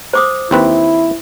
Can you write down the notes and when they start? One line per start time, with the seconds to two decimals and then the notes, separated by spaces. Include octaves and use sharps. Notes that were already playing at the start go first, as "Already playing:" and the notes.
0.13 C5 D6 D#6
0.51 D#2 C4 E4 B4